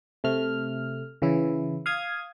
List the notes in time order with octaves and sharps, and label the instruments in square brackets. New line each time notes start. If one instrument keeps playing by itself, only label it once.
[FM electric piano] C3 A3 F6
C#3 E3 E4
F5 D#6 G#6